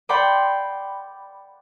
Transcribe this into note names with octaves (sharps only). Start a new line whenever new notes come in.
D5 F#5 G5 B5 C6 D6